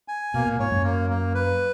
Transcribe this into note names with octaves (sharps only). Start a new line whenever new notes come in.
G#5
B2 A#3
A#2
G#2 C#5
F#2
A#3
A#3
B4